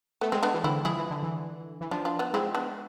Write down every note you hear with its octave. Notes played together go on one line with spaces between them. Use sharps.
A3 B3
G#3 C4
G#3 B3 D4
E3
D3 C4 E4
F3 E4 G#4
E3
D3
E3
E3
F3 D4 F4
D4 F4
B3 D4
G#3 C4 E4
B3 D4